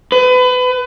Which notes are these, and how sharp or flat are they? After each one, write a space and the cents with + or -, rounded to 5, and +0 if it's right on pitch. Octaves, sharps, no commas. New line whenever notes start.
B4 +30